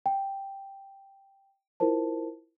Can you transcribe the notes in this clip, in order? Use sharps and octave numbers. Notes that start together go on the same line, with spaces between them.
G5
E4 F4 A#4 C5 A5